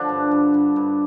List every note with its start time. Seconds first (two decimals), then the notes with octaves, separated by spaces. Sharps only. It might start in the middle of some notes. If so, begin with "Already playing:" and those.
Already playing: D3 F3 D4
0.09 G2
0.31 G2
0.54 G2
0.76 G2